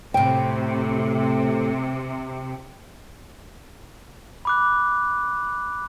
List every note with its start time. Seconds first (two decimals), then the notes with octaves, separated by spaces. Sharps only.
0.14 D2 A2 C3 G5
4.45 B5 D6 F#6